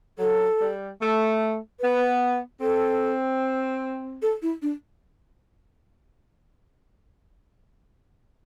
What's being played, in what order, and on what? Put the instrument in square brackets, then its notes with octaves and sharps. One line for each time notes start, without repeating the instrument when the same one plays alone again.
[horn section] F#3 [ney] A4
[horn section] G3
A3
[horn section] B3 [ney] B4
[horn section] C4 [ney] A4
[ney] A4
E4
D4